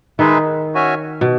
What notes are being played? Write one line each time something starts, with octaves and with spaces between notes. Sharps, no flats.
D#3 G#3 D#4 G#4 B4 E5
C#4 F#4 C#5 E5 G#5
B2